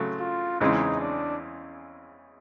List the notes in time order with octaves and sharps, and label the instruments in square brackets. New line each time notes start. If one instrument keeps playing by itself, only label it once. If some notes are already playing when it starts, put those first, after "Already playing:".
Already playing: [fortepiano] C#3 F#3 A3
[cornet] F4
[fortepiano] E2 C#3 E3 G#3 C4 [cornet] D#4
[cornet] D4